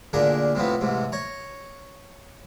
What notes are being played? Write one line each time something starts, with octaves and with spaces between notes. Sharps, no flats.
D2 A#2 D4 G#4 A#4
A2 C3 F3 B3
A1 G#2 C3
C#5 A#5